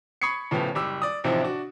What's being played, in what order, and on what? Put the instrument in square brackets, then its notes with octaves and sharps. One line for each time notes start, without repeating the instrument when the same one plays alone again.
[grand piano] B5 C#6 D#6 G#6 C7 C#7
A2 C#3 F3 A3 B3 G4
F#1 G3 D6 E6
D5 D#6
A1 C3 F3 C4 D#4 E4
D4 F#4